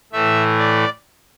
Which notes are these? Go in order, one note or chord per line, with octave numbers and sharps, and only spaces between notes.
A2 E3 A3 E5
D5